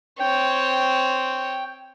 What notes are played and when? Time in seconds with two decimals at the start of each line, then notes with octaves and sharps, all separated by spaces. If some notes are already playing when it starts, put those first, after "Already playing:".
0.20 C4 C#5 G5